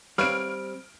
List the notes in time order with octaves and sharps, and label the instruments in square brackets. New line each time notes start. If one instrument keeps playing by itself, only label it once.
[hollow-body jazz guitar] G3 C4 [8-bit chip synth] B4 C#5 F5 [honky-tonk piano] F6 D7